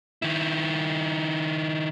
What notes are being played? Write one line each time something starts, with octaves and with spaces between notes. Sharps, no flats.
D#3 E4